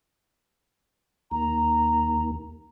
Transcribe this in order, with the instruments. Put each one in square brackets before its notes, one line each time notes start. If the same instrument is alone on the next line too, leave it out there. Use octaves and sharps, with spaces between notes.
[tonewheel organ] D#2 [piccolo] A#5